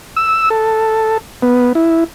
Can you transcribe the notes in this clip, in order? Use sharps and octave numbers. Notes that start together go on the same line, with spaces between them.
E6
A4
B3
E4